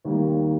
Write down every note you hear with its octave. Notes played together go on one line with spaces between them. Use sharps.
D#2 D#3 G3 A#3